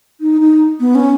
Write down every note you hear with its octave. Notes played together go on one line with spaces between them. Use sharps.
D#4
D#4
B3
C#4